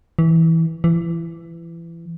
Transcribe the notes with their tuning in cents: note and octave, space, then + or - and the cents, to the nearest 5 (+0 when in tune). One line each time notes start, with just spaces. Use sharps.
E3 -15
E3 +25